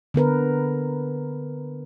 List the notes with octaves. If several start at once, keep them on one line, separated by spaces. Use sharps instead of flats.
D3 B3 A#4 B4